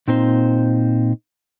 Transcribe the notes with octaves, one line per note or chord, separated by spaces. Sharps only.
A#2 C4 D#4 C5